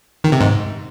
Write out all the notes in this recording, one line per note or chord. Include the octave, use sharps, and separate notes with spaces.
D#3
C3
G#2